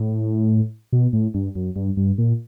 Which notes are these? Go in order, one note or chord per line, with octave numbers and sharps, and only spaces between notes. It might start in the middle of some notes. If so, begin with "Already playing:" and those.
Already playing: A2
B2
A2
G2
F#2
G2
G2
A#2